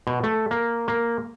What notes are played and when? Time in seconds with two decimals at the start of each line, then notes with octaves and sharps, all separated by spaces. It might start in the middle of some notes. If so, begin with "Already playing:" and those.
0.07 B2
0.23 A3
0.51 A#3
0.88 A#3